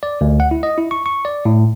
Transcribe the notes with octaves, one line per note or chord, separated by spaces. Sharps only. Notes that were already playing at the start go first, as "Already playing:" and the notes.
D5
D2
F#5
E4
D#5
E4
C#6
C#6
D5
A2